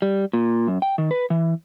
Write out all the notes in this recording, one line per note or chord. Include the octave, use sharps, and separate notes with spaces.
G3
A#2
F#2
G5
D#3
B4
E3